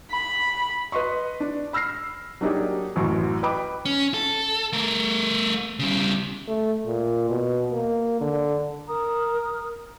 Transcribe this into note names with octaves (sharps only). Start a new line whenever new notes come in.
B5
B4 D#5 C6 C#6
D4
B5 E6 F6 A#6 C7
F#3 A#3 D4 D#4 G4 G#4
A1 F#2 C#6
B4 D#5 G5 B5 D6
C#4
A4
A3 A#4
C#3 G3
A3
A#2
B2
A#3
D3
A#4 A#5 D#6